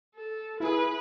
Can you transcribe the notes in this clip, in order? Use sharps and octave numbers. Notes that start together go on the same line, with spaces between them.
A4
E4 G#4 B4